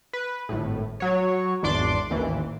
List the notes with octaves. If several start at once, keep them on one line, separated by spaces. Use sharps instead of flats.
B4
G#1 A2
F#3 C#5
G#1 E2 D4 D5 C6 D6
A1 D#2 E3